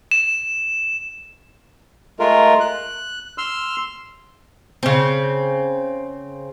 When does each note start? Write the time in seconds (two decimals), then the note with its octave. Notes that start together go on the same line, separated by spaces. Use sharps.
0.11 E7
2.20 G#3 A3 F4 A#4
2.60 F#6
3.38 C6 E6 F6
4.83 C#3 C4